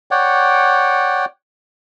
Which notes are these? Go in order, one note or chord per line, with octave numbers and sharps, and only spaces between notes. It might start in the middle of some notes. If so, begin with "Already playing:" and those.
C#5 D5 F#5 G5